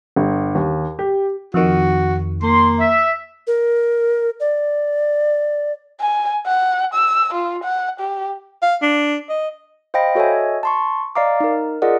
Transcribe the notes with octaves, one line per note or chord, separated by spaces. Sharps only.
G1
D#2
G4
F2 D#3 F#4
A#3 C6
E5
A#4
D5
G#5
F#5
E6
F4
F#5
G4
F5
D4
D#5
C5 D#5 F5 G5 B5 A#6
F#4 A4 C#5 D#5 E5 G#5
A5 C6 C#6
D5 D#5 F5 A#5 D6
D#4 A#4
F4 G#4 A#4 D5 D#5 F#5